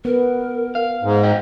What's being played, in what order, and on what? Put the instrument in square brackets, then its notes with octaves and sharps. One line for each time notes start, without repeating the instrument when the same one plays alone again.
[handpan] B3 [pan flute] A#4
[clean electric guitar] F5
[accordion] G#2
[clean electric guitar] C5 D#5 G5